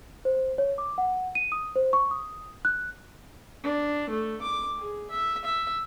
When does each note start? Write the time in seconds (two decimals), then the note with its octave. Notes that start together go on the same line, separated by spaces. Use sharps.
0.25 C5
0.58 C#5
0.78 D6
0.98 F#5
1.35 D#7
1.52 D#6
1.76 C5
1.93 C#6
2.11 D#6
2.65 F#6
3.64 D4
4.10 A3
4.42 D6
4.79 G#4
5.10 E5
5.44 E5